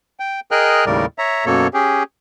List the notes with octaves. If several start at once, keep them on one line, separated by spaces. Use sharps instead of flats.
G5
G#4 A#4 D#5 G5 F6 F#6
D#2 A2 C#3 G3 A#4 D5
C#5 E5 A#5
F#2 B2 A#3 A4 C#5
C#4 G4 G#4